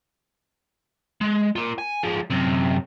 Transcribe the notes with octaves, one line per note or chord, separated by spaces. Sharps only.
G#3
F4 A#4
G#5
F3 G#3
F#2 C3